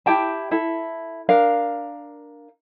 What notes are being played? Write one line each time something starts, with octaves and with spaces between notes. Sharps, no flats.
E4 G4 G5 A5
E4 A4
D4 A#4 F5